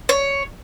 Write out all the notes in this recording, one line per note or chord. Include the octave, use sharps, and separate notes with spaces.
C#5